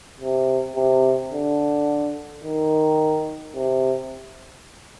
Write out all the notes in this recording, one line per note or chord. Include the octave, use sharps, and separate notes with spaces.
C3
C3
D3
D#3
C3